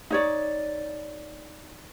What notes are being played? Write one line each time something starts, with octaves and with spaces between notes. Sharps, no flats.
D#4 C#5 D5